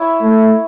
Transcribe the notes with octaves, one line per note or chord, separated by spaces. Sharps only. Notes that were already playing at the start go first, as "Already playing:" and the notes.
Already playing: E4 C#5 E5
A3